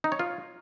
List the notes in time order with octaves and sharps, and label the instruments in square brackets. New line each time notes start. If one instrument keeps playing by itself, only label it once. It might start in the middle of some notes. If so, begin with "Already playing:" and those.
[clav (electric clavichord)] D#4
C#5
F4